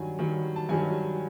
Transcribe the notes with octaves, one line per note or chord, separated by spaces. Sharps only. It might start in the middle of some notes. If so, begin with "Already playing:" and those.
Already playing: G2 D#3 F#3 G#5
G2 D#3 F#3
A5
G2 D#3 F#3 G#5